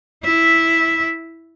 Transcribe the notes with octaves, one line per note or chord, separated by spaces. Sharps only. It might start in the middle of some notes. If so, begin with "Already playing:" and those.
E4 E5